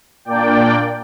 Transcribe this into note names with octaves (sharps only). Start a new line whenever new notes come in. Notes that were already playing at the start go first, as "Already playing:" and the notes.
A#2 A#3 D4 D5 G5